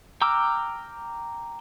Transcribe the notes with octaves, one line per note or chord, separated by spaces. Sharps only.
G5 A#5 D6 E6 F6